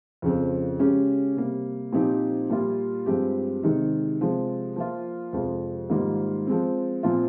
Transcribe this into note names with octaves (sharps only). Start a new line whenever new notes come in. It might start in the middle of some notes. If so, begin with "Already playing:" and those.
F2 C#3 F3 C4
C#3 G#3 C#4 G4
C3 G3 A#3
A#2 F3 C4 D#4 G4
A#2 G3 A#3 F4
G2 F3 G#3 C4 G4
C3 D#3 G#3 D#4
C3 F3 G#3
F3 A#3 F4
F2 C3 F3 G#3
G#2 D#3 G3 A#3 F4
F3 G#3 C4
A#2 F3 C4 F4